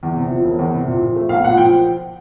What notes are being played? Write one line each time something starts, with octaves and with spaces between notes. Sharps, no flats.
E2
C3
F3
E1
E2
C3
A#2
F3
A3
B1 F5
A#2 F#5
F3 G5